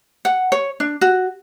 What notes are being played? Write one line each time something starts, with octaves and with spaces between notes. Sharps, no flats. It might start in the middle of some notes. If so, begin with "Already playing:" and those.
F#5
C#5
D4
F#4